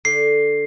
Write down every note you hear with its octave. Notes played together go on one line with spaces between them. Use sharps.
D3 C7